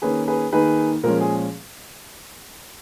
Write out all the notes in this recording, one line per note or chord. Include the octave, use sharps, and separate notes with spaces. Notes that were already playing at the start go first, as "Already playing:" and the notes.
D#3 A#3 C#4 G#4 B4
G#4 B4
D#3 A#3 D#4 G#4 B4
A#2 F3 G#3 C#4 A#4
G#4